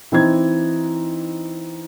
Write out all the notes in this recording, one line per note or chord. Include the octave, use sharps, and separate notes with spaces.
E3 C4 D#4 G#6